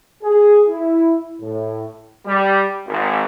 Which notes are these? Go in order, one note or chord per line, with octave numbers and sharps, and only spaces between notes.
G#4
E4
A2
G3
G#1